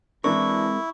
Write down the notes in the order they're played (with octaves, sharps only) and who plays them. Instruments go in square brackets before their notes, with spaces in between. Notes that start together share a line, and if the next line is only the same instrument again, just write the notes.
[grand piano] E3 D4 [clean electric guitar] G#3 C4 A#4 [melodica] E4 [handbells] C#6